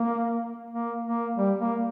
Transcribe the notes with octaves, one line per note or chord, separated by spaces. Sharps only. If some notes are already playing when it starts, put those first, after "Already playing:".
Already playing: A#3
A#3
A#3
G3
A#3